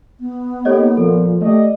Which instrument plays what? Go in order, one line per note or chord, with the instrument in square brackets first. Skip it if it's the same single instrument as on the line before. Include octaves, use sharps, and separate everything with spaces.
[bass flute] B3
[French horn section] A2 D#4 G4 [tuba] A#3 [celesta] A4 C#5 D#5
[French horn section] A#2 [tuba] F3 [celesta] A4
[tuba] A3 [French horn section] G4 D5 D#5